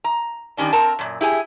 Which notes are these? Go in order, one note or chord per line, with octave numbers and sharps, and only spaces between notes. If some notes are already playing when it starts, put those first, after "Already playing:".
A#5
D#3 G3 C#4 D4
C4 A#4 A5 A#5
F#2 A#2
E4 G4 G#4 G#5